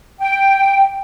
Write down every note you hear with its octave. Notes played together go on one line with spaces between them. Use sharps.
G5